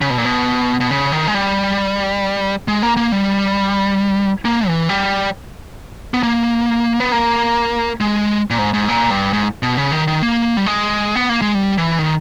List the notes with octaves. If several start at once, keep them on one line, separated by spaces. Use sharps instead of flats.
C#3
B2
A#2
B2
B2
C#3
D#3
G#3
G3
G#3
A#3
A#3
G3
A#3
E3
G3
B3
A#3
B3
A#3
G#3
A#2
G#2
G#2
A#2
G2
G#2
B2
C#3
D#3
D#3
A#3
G3
G#3
B3
A#3
G#3
G3
E3
D#3